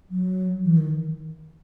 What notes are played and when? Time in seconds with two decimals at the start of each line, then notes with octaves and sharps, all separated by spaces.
0.11 F#3
0.65 E3
0.77 D#3